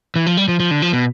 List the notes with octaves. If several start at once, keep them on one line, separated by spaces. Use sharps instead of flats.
E3
F3
G3
F3
F3
D3
F3
B2